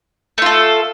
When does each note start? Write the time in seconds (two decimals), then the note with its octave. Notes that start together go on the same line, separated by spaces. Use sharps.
0.38 A3
0.42 F4
0.46 A4